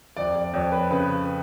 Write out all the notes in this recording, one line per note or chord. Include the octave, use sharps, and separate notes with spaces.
F2 D5
D5
F2 C#5
B4
C#3 B4